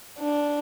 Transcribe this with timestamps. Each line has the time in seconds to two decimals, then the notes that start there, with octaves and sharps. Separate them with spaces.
0.19 D4